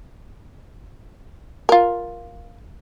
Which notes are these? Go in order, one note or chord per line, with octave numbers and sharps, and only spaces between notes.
F4 A#4